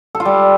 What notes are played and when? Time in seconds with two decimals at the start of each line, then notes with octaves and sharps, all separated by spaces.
0.15 A4
0.20 F4
0.25 G3